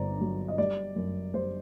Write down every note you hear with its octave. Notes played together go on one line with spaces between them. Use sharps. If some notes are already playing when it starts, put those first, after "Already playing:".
Already playing: G1 G2 C5 D5 A#5
F#3
D#5
G3 D5
F#2
G3 C5